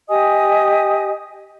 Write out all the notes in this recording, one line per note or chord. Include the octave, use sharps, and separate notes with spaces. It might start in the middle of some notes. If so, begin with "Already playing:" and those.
G4 D#5 G#5 D#6